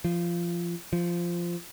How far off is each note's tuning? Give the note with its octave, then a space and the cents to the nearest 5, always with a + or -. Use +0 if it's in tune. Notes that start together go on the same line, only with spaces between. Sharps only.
F3 -20
F3 -10